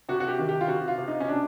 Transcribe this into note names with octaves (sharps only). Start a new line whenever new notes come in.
C3 F#4
F#4
G4
D#3
G4
F4
C3 F#4
F4
C3
D#4
C#4
B2 D4